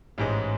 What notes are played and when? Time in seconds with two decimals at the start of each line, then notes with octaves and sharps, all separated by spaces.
0.18 A1 G#2 G#3